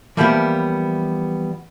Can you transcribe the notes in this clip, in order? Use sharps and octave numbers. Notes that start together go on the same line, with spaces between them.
E3 F3 G3 A#3 B3